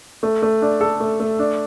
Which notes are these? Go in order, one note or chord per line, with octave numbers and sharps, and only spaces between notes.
A3
A3
D4
A4
A3
A3
D4